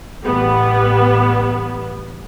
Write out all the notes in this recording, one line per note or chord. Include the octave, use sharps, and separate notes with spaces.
A1 G3 B3